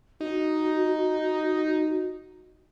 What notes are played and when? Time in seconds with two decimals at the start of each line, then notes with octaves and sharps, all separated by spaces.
0.21 D#4 F#4